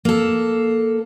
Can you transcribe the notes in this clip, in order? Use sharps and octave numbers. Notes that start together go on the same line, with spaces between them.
A#3 A4